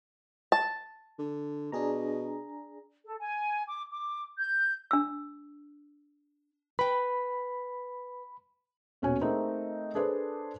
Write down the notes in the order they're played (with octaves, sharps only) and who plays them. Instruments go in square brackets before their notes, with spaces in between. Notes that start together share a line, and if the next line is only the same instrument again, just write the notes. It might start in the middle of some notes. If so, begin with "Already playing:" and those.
[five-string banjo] A5
[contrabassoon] D3
[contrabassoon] B2 [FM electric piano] D4 G#4 A#5
[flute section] A4
G#5
D6
D6
G6
[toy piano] D4 E6
[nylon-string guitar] B4 G5 [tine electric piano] B5
[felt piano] D#1 B2 C#4 F#4 C#5 G#5
A3 C4 D#4 G#4 A#4
D4 G#4 A4 B4 C5 D5